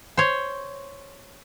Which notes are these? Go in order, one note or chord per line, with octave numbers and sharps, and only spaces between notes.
C5 C#5